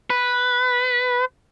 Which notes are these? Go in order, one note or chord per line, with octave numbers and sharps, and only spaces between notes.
B4